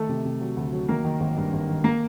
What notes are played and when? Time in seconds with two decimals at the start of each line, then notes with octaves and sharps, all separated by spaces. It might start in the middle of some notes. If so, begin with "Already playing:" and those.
Already playing: D#3 A3 A4
0.09 C3
0.25 C3
0.41 F#3
0.56 D2
0.73 F#3
0.89 D#3 A#3 A#4
1.05 D#3
1.20 G#1
1.37 G2
1.53 G#1
1.68 D#3
1.84 A#3 A#4